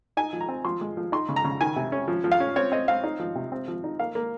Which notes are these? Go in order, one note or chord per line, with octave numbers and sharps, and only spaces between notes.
D#4 G#5
F3
A#5
C4
F3 C6
G#3
F3
D#4 C6
C#3
A#5
C#3
D#3 G#5
C3
C#4
F3
F3
F5
C#4
C4 C#5
C4 D#5
C4 F5
D#4
F3
C3
C4
F3
D#4
A#3 F5
A#3